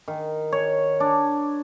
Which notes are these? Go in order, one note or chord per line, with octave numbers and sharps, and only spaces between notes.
D#3
C#5
D4